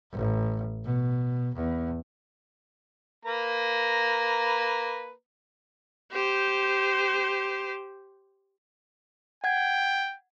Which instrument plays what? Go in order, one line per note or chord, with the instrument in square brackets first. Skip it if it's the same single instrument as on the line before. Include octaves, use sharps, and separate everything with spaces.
[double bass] A1
B2
E2
[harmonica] A#3 B4 A#5
[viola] G4 C5
[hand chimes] F#5 G#6 [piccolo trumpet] G5